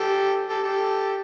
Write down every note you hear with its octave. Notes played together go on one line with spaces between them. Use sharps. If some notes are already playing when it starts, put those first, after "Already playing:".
Already playing: G4 A4
G4 A4
G4 A4